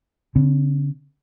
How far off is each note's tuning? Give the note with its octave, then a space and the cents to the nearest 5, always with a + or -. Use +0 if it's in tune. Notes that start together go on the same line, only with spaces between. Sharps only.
D3 -45 C4 +0